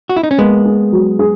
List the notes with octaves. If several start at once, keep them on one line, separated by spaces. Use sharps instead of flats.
F#4
E4
D#4
C#4
G#3 A#3 B3
G#4
F#3
G#4